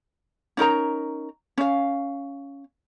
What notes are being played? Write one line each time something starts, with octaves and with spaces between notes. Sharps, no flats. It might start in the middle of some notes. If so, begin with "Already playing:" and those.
C#4 D#4 A#4 A#5
C#4 F5